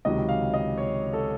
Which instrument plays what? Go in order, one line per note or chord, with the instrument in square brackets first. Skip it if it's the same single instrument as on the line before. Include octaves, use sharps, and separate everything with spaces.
[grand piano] C#2 C3 D#3 F#3 D#5
F5
D#5
C#5
A4